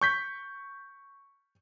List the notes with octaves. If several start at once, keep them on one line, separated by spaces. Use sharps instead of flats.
C#6 G6 B6